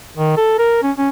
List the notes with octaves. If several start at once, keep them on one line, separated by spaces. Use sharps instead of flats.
D#3
A4
A#4
C#4
C#4